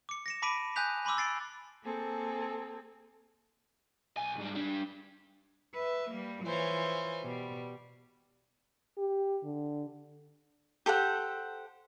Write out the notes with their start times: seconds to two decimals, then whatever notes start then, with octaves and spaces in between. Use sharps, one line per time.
0.09 D6 C#7
0.26 A#6 C#7 E7
0.42 A5 B5 D6 B6 D7 D#7
0.76 G#5 D#6 F#6 G6 B6 F7
1.05 G#5 B5 C6 D6 E6
1.17 C6 E6 A6 C7 D7
1.84 A#3 C4 G#4 A4
4.17 B1 G#5
4.37 G#2 G3
4.55 G3 D4
5.74 B4 E5
6.11 G3 A#3
6.43 E3 F4 C5 C#5 G#5
7.22 B2 G3
8.98 G4
9.44 D3
10.86 G4 A4 C5 F#5